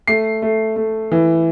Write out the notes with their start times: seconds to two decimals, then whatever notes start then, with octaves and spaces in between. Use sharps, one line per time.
0.07 A3 C7
0.42 A3
0.76 A3
1.12 E3